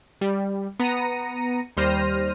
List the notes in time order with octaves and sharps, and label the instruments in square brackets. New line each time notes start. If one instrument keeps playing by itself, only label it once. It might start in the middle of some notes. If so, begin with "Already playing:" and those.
[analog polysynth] G3
B3 A#5 A#6 C#7 D#7
D#2 G3 C5 F6 A#6 D#7